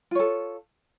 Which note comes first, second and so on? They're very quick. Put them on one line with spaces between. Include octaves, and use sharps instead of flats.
F4 C#5 A4